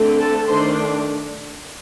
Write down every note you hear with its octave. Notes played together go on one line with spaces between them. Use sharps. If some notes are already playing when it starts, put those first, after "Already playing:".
Already playing: D3 A3 C4
A4 A5
D#3 A3 D4 C5 C6